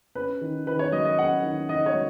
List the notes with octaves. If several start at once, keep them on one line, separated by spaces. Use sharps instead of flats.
C#4 B4
D#3
D#3 B4
C#5
F#3 D#5
D#5
C#4 F#5
D#3
D#3 D#5
C#5
F#3